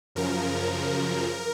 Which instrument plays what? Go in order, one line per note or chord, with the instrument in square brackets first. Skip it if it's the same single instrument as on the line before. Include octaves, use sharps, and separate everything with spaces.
[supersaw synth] F#2 C#3 F3 A#4